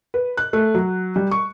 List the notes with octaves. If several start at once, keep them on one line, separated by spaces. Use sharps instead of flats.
B4
F#6
A3
F#3
G3
C#6